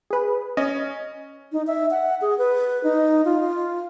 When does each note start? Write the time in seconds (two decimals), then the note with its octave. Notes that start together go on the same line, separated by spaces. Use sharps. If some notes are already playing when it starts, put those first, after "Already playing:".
0.10 G#4 B4
0.57 C#4 D#5
1.52 D#4
1.67 E5
1.91 F#5
2.21 G#4
2.38 B4
2.84 D#4
3.25 F4